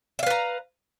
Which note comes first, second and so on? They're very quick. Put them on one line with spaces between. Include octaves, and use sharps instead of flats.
E5 F5 B4 A#5